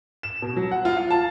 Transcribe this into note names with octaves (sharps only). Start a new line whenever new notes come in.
E7
B2
F#3
F#5
F4
F5
A5